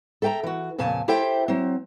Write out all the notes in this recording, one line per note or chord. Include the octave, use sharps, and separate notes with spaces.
A4 E5 G5 A5 A#5
E3 F#4
F2 A#2 C#3 G#5 A5
E4 G4 A4 C5 E5 G5
F#3 C4